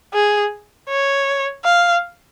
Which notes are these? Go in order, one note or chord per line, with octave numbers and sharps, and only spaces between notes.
G#4
C#5
F5